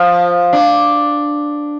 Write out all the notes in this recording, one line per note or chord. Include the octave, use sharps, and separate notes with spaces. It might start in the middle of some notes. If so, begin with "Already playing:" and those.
Already playing: F3
D4